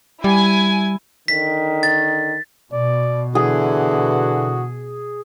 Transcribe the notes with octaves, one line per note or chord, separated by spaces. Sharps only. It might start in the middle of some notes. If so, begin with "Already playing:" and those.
G3 E4 G#5
D3 D#3 B6
A6
B2 D5
D3 E3 F#4 G#4